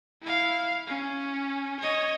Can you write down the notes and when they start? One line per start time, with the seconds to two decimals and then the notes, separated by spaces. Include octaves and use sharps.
0.22 E4 F5
0.87 C#4
1.80 C#5 D#5